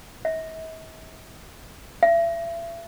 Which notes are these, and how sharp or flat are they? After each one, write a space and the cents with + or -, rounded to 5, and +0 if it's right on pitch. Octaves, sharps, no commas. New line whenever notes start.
E5 -45
E5 +35